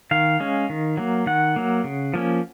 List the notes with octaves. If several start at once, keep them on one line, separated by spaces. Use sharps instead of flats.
D#3 F5
G#3 C#4
D#3
F#3 A#3
D#3 F#5
F#3 A#3
C#3
F3 A#3 C#4